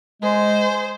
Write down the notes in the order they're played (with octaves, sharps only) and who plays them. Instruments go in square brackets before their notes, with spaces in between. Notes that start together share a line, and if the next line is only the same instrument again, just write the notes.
[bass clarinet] G#3 [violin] C5